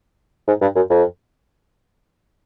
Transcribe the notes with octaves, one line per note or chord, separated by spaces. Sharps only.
G#2
G2
F#2
F2